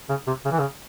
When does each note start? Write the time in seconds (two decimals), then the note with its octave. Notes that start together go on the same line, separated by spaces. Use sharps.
0.09 C#3
0.27 C3
0.45 C#3
0.52 E3
0.59 C#3